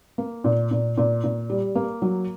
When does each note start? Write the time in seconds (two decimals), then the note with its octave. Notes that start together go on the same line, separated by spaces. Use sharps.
0.18 A#3
0.44 A#2
0.71 A#2
0.98 A#2
1.24 A#2
1.50 G3
1.75 A#3
2.02 F#3